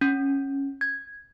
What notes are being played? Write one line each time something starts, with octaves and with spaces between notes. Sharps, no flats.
C#4
G#6